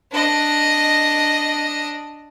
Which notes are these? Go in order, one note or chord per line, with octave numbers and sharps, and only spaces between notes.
D4 D#5